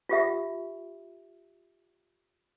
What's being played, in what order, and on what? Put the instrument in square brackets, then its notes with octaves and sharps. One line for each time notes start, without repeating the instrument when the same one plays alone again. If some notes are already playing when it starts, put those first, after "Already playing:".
[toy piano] F4 G4 E5